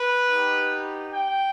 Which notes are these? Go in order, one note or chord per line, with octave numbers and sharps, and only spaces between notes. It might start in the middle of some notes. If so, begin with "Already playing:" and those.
Already playing: B4
B3 D#4 G4
G5